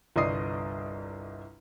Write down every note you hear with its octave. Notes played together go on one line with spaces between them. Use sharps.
G1 C2 D5 D#5 D#6 C7